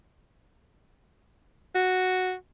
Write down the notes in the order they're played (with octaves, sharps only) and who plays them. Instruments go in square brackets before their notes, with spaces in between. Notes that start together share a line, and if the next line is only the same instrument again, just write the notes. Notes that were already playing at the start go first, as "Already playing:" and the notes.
[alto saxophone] F#4